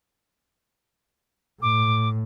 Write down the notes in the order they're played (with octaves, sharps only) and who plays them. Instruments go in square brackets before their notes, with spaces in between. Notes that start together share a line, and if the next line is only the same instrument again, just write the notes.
[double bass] A2 [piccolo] D6